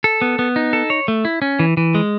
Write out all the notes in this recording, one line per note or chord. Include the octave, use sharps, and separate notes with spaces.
A4
B3
B3
D#4
A4
C#5
A3
E4
C#4
E3
E3
G#3